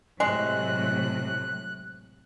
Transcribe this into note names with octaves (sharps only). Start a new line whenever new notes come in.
A2 C3 F#3 G#3 F#6